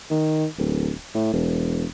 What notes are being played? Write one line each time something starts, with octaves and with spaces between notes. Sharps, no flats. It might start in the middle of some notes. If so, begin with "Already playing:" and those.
D#3
D1
A2
E1